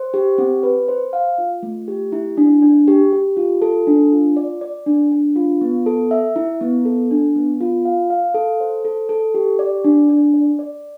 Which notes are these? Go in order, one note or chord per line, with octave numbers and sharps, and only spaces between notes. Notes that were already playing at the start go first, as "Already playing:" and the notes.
Already playing: C5
G4
C4
B4
C5
F5
F4
A3
G4
E4
D4
D4
G4
G4
F4
A4
D4
F4
D5
D5
D4
D4
F4
B3
A4
E5
E4
B3
A4
D4
B3
F4
F5
F5
A4
C5
A4
A4
G4
D5
D4
D4
D5
D5